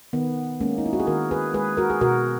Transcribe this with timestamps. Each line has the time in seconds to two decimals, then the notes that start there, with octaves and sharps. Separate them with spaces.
0.13 D#3 B3
0.60 G#3 A#3 C#4
0.78 D#4
0.86 E4
0.93 F#4
1.00 G#4
1.07 D#3 F#4 A#4
1.31 G#4 B4
1.54 G#3 G#4 B4
1.77 F#4 A#4
1.90 G#4
2.01 B2 F#4 A#4